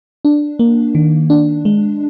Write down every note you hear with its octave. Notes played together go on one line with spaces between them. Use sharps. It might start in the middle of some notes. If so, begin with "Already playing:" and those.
D4
A#3
D#3
D4
G#3